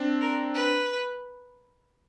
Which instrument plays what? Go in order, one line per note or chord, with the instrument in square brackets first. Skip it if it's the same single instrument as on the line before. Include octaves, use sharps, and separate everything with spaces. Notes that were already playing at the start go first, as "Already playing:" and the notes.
Already playing: [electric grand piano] C4 D4
[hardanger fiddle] A#4
B4